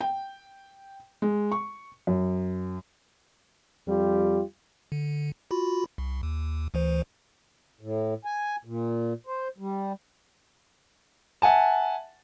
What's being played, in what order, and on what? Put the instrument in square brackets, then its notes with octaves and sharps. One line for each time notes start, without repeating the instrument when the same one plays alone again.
[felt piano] G5
G#3
C#6
F#2
[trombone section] F2 G3 F4 G4
[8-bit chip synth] D3
F4 F#4 B5
C2
D#2
D2 E3 C5
[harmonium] A2
G#5
A#2
C5
G3
[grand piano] E5 F#5 G#5 A5